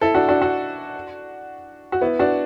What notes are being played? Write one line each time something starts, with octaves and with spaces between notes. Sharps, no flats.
E4 A4
D4 F#4
D4 F#4
D4 F#4
F#4
B3 E4
D4 F#4